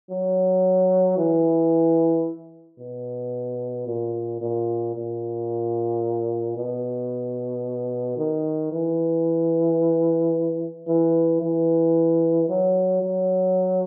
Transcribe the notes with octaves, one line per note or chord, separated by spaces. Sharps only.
F#3
E3
B2
A#2
A#2
A#2
B2
D#3
E3
E3
E3
F#3
F#3